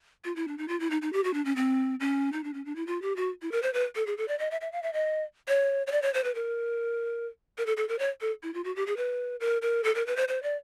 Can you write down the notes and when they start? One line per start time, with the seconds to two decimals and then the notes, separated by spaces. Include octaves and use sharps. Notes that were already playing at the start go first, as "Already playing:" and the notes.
0.25 F4
0.36 E4
0.48 D4
0.58 D#4
0.68 F4
0.80 E4
0.91 D#4
1.02 D#4
1.13 G4
1.24 F#4
1.34 D4
1.45 C#4
1.56 C4
2.00 C#4
2.32 D#4
2.44 D4
2.54 C#4
2.65 D4
2.76 E4
2.87 F4
3.02 G4
3.16 F#4
3.42 E4
3.52 A#4
3.63 C5
3.74 B4
3.96 A4
4.07 G#4
4.17 A4
4.28 D5
4.39 D#5
4.51 E5
4.61 E5
4.72 F5
4.83 E5
4.93 D#5
5.48 C#5
5.87 C#5
5.92 D5
6.02 C#5
6.14 C5
6.24 B4
6.35 A#4
7.58 A#4
7.66 A4
7.77 A4
7.89 A#4
7.99 C#5
8.21 A4
8.43 E4
8.54 F4
8.64 F#4
8.76 G4
8.87 G#4
8.97 B4
9.40 A#4
9.62 A#4
9.84 A4
9.95 A#4
10.07 B4
10.16 C5
10.28 C5
10.43 D5